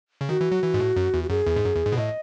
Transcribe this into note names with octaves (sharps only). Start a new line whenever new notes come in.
C#3
D#3 F#4
E3
F#3
E3
G#2
A2
F#2
E2
F#4
F#2 G#4
E2
G#2
F#2
E2
G#2
B2
A2 D#5